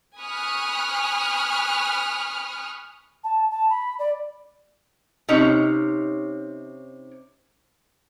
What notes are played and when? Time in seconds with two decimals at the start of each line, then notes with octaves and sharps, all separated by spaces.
0.20 G#5 B5 C#6 D#6 F6 F#6
3.24 A5
3.51 A5
3.70 B5
3.99 D5
5.29 C3 C#4 D#4 C#5